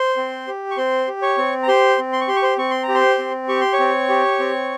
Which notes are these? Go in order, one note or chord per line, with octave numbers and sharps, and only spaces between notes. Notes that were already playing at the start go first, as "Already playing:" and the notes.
Already playing: C5 C6
C4
G4
C#6
C4 C5 C6
G4
C#5 C#6
C4
A#5
G4 C5 C6
C4
C6
C#6
G4 C6
C#6
C5 C6
C4 C#6
C6
A#5
G4
C5 C6
C4
G4 C#6
C6
C#5 C#6
C4
G4
C4